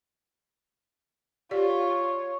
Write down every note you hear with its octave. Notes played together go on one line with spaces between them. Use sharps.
F4 G4 C#5 D5